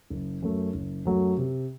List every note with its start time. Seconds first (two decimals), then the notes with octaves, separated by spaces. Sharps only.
0.10 F#1
0.42 F#2 F#3 A3
0.74 F#1
1.05 F#2 F#3 A3
1.38 C3